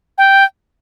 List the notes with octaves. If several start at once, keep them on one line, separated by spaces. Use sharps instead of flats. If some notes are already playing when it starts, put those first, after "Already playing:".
G5